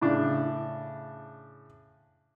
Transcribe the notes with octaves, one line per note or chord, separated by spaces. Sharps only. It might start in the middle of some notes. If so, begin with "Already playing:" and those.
A2 C#3 D4